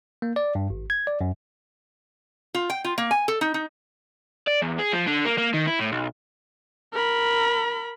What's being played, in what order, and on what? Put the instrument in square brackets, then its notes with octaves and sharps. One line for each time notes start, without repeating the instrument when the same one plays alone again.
[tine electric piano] A#3
D5
G2
G#1
G#6
D5
F#2
[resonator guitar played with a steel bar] F4
G5
F4
A#3
G#5
A4
D#4
D#4
[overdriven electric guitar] D5
E2
G#4
F3
D3
A#3
A#3
D#3
E4
A2
B1
[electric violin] A#4 B5